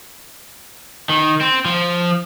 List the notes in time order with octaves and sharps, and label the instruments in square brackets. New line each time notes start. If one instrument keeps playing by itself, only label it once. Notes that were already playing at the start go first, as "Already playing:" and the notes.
[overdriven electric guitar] D#3
C4
F3